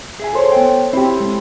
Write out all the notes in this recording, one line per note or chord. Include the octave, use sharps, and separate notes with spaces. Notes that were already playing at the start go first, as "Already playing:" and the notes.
G#4 E5 G#5
A4 C5 C#5
B3 G5
C4 E4 G4
G#3